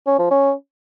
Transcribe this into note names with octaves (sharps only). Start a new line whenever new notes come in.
C#4
F3
C#4